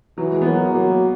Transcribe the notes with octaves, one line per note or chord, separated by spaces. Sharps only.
E3 F#3
G#3
B3
F#3 A#3
A#3
F#3 A#3